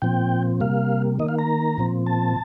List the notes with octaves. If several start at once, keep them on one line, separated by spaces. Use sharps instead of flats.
A#2 F3 C4 G5
C3 G3 A#3 F5
D#3 A#3 D#5
F5
A#5
A#2 F3 C4
A5